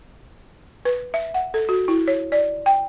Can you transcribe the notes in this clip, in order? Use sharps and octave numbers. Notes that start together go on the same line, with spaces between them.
B4
E5
F#5
A4
F#4
E4
C#5
D5
G5